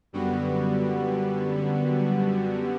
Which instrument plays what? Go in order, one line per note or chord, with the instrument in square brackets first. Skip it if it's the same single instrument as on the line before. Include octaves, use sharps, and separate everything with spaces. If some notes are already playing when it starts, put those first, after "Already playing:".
[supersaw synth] F#2 D3 G3 B3 F#4